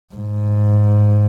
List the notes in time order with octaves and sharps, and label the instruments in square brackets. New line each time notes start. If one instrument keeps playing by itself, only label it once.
[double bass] G#2